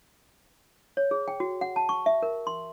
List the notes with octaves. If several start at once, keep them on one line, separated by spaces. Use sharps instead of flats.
C#5
G#4
G5
F#4
F#5
A5
C#6
E5
A#4
C6